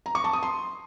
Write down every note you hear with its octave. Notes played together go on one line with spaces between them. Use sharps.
A#5
C#6
A5
D#6
C6